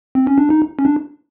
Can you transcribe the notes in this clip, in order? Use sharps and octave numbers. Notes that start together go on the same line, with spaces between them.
C4
C#4
D4
D#4
C#4
D4